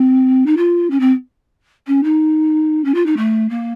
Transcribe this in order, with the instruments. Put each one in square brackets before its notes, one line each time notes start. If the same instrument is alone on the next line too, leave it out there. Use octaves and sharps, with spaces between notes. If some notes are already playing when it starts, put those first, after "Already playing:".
Already playing: [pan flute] C4
D#4
F4
C#4
C4
C#4
D#4
C#4
F4
D#4
A3
A#3